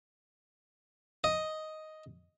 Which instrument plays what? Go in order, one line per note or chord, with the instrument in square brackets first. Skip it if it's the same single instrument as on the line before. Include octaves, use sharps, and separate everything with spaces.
[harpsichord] D#5